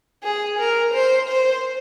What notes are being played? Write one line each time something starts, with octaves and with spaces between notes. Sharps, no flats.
G#4
A#4
C5
C5